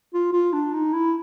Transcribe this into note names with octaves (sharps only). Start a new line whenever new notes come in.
F4
F4
D4
D#4
E4